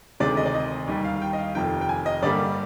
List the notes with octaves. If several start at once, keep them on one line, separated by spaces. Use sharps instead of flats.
D2 C3 D#3 G#3 D5
D#5
D5
D#5
D#2 D#3 G3
F5
F5
G5
D#5
F5
F1 F2 D#3 G5
G5
G#5
D#5
G2 D3 G3 A#3 D5